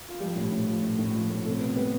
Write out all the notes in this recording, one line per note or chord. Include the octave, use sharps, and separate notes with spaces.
F4
F3 G3 G4
A2
A2
F3
A2
A2
F3
A2
C3 A3 A4
C3 B3 B4
G3 B3 B4